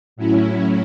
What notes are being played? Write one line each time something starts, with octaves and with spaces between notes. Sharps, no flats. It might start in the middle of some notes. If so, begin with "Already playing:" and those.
A2 F#3 C#4 E4